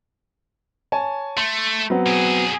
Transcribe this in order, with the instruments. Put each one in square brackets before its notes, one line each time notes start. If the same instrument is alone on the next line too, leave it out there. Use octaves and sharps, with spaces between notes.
[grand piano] C#5 G#5 A5
[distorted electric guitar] A3 [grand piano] C6
[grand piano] F#3 B3 C4
[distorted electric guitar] B2 G#4